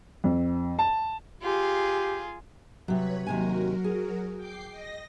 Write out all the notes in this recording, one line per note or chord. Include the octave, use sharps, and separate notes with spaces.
F2
A5
F4 G4 G#4
C3 F#3 B4 C#5 B5
D#2 C3 F#3 F#4 A#4 G#5
G#4
G5 D6 C7
D#5 A#6